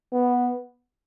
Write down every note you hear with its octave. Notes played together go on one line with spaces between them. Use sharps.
B3